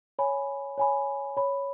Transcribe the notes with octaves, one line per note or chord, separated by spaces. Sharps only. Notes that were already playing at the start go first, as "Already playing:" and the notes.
C#5 G#5 B5
C#5 G#5 B5
C#5 B5